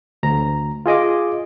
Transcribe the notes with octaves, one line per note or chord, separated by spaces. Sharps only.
D2 A#5
F4 G#4 D#5 D6